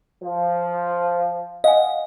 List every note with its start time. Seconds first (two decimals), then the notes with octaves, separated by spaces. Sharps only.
0.23 F3
1.64 D#5 F5 F#5 G#5